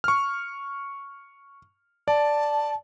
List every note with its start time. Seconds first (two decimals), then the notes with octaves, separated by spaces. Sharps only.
0.04 C#6 F6
2.08 D5 A5